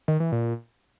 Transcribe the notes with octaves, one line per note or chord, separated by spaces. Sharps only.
D#3
E3
A#2